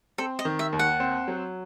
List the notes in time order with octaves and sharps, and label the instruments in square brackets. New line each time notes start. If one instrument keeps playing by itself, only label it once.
[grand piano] C4 [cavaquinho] A4
[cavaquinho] D#5
[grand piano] D#3
[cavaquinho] E5
[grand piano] D#2
[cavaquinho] F#5
[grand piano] C4
F#3